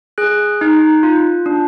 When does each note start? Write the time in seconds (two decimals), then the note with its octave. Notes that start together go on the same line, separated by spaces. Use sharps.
0.18 G#4 F#6
0.61 D#4
1.03 F4
1.46 D4